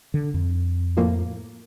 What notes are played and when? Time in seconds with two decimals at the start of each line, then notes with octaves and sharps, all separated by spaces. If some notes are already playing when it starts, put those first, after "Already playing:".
0.14 D3
0.34 F2
0.97 A2 F3 A#3